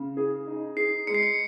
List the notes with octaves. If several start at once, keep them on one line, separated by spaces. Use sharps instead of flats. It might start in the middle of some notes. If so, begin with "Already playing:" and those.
Already playing: C#3
G#4
D#4
G#4 C7
G#3 C#7
C7
C#7